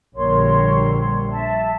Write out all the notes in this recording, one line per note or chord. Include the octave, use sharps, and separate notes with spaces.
A#1 D3 G3 A#4 C#5 C6
E5 A5